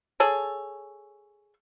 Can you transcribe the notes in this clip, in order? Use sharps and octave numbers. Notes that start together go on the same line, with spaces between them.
G#4 A4 C#5